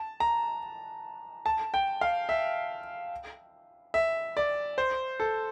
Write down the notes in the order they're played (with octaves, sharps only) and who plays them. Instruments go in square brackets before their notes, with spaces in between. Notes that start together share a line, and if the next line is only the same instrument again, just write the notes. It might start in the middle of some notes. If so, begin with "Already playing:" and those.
Already playing: [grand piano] A5
A#5
A5
G5
F5
E5
E5
D5
C5
A4